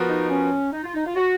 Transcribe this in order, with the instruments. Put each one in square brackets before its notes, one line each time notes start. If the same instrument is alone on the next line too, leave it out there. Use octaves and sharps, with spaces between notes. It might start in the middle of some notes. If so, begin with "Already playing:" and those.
Already playing: [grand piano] F3 B3 F#4 A#4
[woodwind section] D#4
C#4
D#4
F4
D#4
F4
F#4